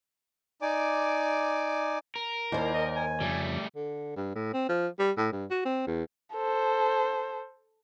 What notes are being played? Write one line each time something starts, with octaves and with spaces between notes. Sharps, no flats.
D#4 D5 G#5 D6
A#4
D#2 E4 C5 D5 G5
D#5
G#5
F2 C#3 G3 A3
D3
G2
A2
C4
F3
G3
A2
G2
F#4
C4
E2
A4 C5